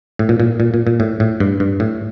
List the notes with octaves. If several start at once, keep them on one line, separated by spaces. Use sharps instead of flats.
A2
A#2
A#2
A#2
A#2
A#2
A2
A2
G2
G2
A2